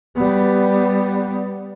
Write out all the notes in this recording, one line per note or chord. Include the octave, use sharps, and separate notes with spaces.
G3 B3